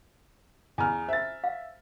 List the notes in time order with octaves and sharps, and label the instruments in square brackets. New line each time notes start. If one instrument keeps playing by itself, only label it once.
[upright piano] E2 F6 [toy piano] G#5 A#5
[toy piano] C5 [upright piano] E5 A6
[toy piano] F5